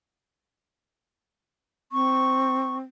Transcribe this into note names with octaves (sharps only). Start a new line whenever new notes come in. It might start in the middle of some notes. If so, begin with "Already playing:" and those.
C4 C#6